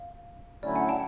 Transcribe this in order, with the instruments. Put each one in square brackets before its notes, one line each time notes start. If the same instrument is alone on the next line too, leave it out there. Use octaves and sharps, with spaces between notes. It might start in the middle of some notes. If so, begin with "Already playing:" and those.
Already playing: [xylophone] F5
[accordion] D3 F#3 A3 C#4 E4 [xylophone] D5
[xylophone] F#5 G#5
G5 A5